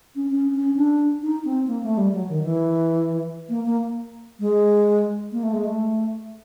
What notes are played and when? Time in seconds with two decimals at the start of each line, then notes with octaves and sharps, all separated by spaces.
0.16 C#4
0.31 C#4
0.54 C#4
0.76 D4
1.23 D#4
1.45 C4
1.67 A#3
1.83 A3
1.97 G3
2.13 F#3
2.29 D#3
2.43 E3
3.49 A#3
3.65 A#3
4.40 G#3
5.32 A#3
5.43 A3
5.53 G#3
5.65 A3